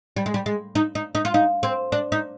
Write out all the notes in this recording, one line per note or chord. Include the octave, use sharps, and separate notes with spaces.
G3
G#3
G3
G#3
D#4
D#4
D#4
F4
D#4
C4
D4
D#4